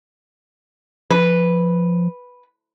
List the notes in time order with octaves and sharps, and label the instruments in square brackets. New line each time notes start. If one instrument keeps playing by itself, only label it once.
[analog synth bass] F3 [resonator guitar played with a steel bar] B4